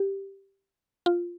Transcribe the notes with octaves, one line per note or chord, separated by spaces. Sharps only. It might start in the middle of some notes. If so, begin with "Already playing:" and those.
Already playing: G4
F4